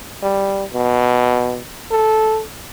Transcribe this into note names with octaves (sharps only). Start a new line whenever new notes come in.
G3
B2
A4